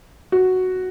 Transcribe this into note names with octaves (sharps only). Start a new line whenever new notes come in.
F#4